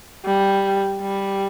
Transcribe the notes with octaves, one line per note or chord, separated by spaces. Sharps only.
G3
G3